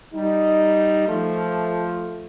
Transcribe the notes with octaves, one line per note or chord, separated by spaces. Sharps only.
G3 D#4
F3 A3